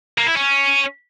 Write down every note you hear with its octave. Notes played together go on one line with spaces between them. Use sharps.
A#3
E4
C#4